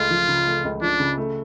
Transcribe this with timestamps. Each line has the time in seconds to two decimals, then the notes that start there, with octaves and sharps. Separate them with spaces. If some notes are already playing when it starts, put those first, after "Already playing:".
Already playing: C#2 A3 F4
0.11 F3
0.29 C#3
0.47 A3
0.65 C#2
0.82 F3 D4
1.00 C#3
1.17 A3